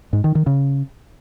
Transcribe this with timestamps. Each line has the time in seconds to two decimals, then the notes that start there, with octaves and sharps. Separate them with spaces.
0.13 G#2
0.24 D#3
0.35 D#3
0.47 C#3